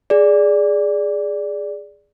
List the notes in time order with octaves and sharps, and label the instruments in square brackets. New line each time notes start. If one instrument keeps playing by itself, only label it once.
[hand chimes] G#4 D5